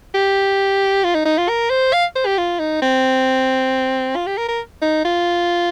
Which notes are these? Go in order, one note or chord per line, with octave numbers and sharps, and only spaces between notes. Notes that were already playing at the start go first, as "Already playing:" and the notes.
G4
F4
D#4
D#4
F4
A#4
C5
F5
C5
G4
F4
D#4
C4
F4
G4
A#4
A#4
D#4
F4